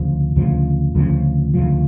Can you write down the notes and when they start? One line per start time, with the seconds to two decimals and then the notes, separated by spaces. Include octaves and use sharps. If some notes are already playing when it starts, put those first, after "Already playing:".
Already playing: D2 C#3 F3
0.36 D2 C#3 F3
0.95 D2 C#3 F3
1.54 D2 C#3 F3